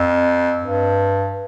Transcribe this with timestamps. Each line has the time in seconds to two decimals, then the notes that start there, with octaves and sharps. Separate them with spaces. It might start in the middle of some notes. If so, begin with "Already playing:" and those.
Already playing: F2
0.62 G2